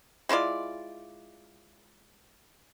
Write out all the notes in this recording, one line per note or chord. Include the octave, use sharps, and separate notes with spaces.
G#3 E4 F4 D5